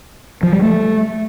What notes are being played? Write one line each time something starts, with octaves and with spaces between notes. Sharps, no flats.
F3
G3
A3